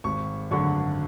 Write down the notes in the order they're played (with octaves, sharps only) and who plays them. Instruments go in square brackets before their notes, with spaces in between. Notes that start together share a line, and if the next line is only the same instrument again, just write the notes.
[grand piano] G#1 C#6
F#2 D3 F#3 C#6